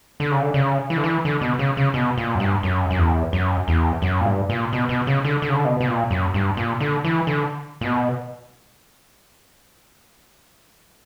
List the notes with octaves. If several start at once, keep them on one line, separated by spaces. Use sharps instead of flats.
D3
C#3
D3
C#3
E3
D3
E3
D3
B2
C#3
C#3
B2
A#2
F#2
G2
F#2
F#2
E2
F#2
E2
F#2
A#2
G2
A#2
B2
B2
C#3
D3
D3
C#3
D3
B2
B2
A#2
F#2
G2
A#2
D3
E3
D3
A#2
B2